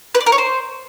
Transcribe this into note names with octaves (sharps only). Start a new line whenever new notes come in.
B4
D5
A#4
C#5
C5